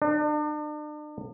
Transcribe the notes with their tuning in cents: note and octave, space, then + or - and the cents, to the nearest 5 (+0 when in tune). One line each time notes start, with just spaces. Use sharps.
D4 +40